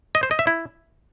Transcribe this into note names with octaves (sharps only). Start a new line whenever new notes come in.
D#5
C5
D#5
E5
E4